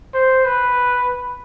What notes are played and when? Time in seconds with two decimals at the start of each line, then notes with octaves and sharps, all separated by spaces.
0.14 C5
0.45 B4